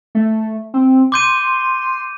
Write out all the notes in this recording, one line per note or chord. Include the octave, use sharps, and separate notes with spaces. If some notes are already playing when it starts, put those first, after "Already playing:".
A3
C4
C6 D6 G6 D#7